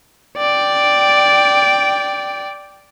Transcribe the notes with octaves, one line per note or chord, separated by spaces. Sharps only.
D5 G5